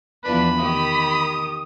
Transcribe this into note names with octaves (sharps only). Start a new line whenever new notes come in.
E2 F3 D4 B4 B5
D#3 G4 D#6